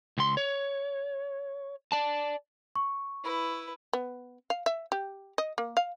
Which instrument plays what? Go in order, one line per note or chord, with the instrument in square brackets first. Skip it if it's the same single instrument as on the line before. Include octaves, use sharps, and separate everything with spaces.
[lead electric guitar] C#2 C6
C#5
D5 A5
[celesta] C#6
[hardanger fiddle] E4 B4
[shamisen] B3
F5
E5
G4
D#5
A#3
F5